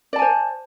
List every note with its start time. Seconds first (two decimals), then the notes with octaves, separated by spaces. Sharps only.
0.13 D5
0.16 A5
0.19 G#5
0.22 C5